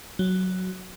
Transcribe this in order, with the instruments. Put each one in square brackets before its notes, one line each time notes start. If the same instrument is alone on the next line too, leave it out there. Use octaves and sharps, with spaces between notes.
[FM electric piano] F#3